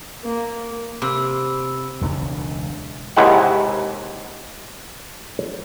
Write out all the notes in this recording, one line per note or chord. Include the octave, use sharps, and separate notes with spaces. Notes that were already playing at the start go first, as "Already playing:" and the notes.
A#3
C3 B5 E6
E1 C#2 C#4 D4
D#2 G#2 C3 G#3 E4 F#5